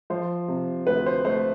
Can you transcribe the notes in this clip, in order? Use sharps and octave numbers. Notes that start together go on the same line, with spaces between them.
F3 C5
C3
D2 B4
C5
A3 C5